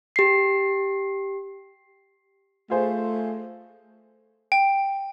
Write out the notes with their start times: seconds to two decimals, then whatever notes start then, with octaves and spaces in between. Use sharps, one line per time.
0.16 G4 C7
2.70 A3 F4 G#4 C5
4.52 G5